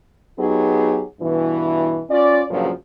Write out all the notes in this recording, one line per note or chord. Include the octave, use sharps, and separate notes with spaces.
F#3 B3 D#4 G4 G#4
G2 B2 E3
C#4 F4 D5
G2 A#2 C#3 F3 F#3